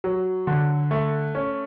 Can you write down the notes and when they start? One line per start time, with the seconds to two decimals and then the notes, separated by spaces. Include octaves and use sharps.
0.04 F#3
0.47 D3
0.91 A3
1.35 C#4